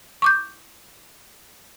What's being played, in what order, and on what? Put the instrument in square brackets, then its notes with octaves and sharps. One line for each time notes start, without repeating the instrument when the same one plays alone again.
[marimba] C#6 D6 G6